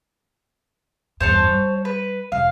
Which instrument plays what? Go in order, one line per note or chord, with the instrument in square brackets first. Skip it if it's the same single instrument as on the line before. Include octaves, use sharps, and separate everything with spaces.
[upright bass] E2 G2 [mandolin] C5 C#5 A5
[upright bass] G3
[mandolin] B4
[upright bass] F1 [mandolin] F5